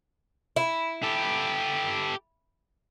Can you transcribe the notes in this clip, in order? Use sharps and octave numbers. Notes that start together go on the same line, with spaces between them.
E4
G4 A4